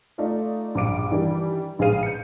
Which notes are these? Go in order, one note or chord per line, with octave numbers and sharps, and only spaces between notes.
A3 D#4 F4 D5
A#1 G2 D6 D7
D#3 E3 G3 D4
A#1 G#3 G#4 B4 F5 D#7
G6 C#7